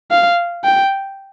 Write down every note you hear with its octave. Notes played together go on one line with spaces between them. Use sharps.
F5
G5